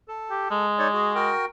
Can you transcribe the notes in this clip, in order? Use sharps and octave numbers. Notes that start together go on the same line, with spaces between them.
A4
G4
G#3
D#4 C#5 D5
F#4 G#4
F#4 A#4 G5